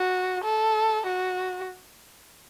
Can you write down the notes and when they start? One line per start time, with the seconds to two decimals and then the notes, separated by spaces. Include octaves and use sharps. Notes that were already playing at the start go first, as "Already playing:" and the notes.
Already playing: F#4
0.45 A4
1.07 F#4